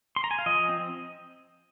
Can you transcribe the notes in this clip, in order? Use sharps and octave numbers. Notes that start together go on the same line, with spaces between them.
C6
A#5
G#5
F5
F3 D#5
C4